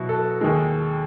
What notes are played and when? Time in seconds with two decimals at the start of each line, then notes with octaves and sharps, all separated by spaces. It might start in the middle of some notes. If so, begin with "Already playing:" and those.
Already playing: B2 F#3 E4 F#4
0.09 A4
0.41 D#2 D#3 G#3